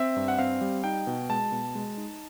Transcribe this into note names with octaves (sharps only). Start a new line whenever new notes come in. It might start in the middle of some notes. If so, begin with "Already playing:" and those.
Already playing: C4 E5
G2
F#5
C4 F5
G3
D#4 G5
B2
G#3 A5
B2
G#3
D#4